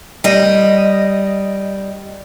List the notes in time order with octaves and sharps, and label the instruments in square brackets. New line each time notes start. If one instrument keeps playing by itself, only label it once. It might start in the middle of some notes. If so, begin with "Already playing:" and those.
[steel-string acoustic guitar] G3 D#5